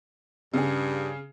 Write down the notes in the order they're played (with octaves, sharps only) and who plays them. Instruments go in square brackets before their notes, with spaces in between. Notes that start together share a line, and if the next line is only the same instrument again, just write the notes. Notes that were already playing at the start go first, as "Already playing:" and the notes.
[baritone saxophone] G2 [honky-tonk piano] C#3 G#4